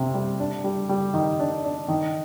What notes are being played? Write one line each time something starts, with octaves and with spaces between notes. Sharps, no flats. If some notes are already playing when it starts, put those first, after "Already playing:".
Already playing: C3
G3
D4
G3
G3
D#3
D4
D4
D#3